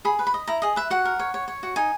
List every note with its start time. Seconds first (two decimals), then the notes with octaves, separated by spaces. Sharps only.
0.05 G#4 B5
0.19 B4
0.27 B5
0.34 D#5
0.47 E4 A#5
0.62 G#4 D#5
0.76 B4 E5
0.90 F#4 F#5
1.05 A#4
1.19 C#5
1.34 C#5
1.48 C#5
1.63 F#4
1.76 D#4 G#5